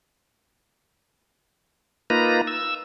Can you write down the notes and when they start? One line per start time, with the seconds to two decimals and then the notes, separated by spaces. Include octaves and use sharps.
2.10 A#3 D#4 F4 B4 A#5
2.47 E6